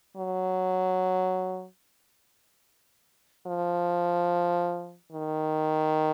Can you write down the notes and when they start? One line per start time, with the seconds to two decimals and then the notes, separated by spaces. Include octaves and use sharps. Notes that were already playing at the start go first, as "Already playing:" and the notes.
0.17 F#3
3.47 F3
5.12 D#3